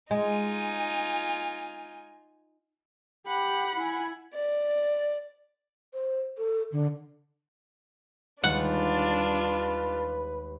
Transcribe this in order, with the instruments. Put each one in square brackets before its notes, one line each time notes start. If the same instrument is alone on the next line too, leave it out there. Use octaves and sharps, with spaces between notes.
[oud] G#3 [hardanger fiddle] D#4 F4 [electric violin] G#5
[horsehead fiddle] G4 [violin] F#5 B5
[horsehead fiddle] E4 G#5
[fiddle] D5
[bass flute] C5
A4
D3
[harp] D#2 G3 G#3 [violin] D4 F4 [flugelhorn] B4 [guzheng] F#5